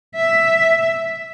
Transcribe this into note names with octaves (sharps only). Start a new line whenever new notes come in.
E5